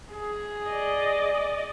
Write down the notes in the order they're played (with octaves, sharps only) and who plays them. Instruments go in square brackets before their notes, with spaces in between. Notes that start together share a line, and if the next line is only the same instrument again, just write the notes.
[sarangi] G#4
[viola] D5 D#5